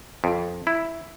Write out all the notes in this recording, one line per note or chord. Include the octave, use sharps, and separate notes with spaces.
F2
E4